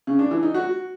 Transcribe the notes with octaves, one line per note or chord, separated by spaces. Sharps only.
C#3
D4
E3
D#4
F#4